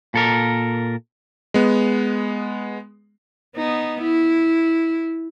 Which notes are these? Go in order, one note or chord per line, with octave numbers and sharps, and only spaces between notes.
A#2 A4 A#4
G#3 B3
B3 D#4
E4